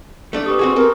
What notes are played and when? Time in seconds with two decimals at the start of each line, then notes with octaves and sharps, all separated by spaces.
0.33 A3 D4 D5
0.46 G4 B4 C#6 D#6
0.59 C4 F#4 G#4
0.76 C4 A4 A#4